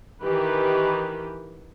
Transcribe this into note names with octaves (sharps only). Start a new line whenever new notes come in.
D#3 E3 G4 B4